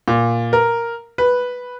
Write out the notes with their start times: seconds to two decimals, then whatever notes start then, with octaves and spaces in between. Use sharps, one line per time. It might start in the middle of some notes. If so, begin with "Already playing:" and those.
0.08 A#2
0.53 A#4
1.18 B4